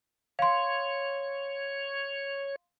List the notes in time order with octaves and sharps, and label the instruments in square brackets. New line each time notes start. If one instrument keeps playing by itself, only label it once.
[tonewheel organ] C#5 [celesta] F5 C6